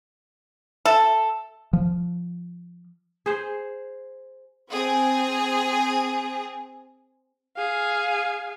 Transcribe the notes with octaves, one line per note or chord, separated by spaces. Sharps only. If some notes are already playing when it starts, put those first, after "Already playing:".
A4 E5
F3
G#4 C5
C4 G#4
G#4 F5